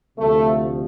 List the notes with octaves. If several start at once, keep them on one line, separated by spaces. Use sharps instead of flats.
D2 C3 F3 A3